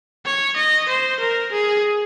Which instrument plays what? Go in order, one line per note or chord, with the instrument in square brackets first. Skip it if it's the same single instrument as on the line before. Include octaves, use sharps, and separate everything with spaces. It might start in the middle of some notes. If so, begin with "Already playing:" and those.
[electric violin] C#5
D#5
C5
A#4
G#4